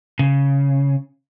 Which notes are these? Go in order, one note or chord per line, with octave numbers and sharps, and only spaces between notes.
C#3